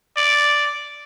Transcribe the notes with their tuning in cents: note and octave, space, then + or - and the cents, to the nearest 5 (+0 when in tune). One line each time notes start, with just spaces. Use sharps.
D5 +0